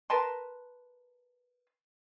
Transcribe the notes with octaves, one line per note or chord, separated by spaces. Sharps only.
A#4 B4 A5 C6